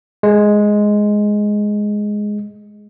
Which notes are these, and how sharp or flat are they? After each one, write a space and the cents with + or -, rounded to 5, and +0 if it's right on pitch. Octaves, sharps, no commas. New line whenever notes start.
G#3 +5